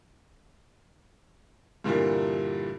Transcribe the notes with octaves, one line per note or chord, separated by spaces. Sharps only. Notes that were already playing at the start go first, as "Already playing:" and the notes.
G2 A#2 D3 E3 G3 A#3